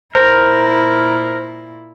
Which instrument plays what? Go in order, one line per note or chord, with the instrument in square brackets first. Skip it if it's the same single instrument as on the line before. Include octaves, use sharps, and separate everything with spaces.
[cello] A#2 E4 [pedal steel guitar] A#4 [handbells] C5